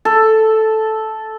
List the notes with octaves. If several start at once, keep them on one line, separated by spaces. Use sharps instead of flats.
A4